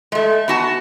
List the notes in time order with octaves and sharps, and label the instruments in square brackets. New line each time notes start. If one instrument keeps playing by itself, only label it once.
[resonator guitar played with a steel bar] G#3 A3
B3 F#4 A5